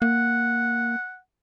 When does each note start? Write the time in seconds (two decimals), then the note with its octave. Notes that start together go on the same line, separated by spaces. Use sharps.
0.02 A#3 F#5